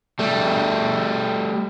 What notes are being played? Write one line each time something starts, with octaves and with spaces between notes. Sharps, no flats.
G3 A3